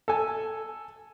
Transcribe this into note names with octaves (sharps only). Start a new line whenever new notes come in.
A4 G#5